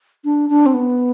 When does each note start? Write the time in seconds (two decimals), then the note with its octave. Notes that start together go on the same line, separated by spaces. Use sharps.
0.25 D4
0.50 D4
0.66 C4
0.74 B3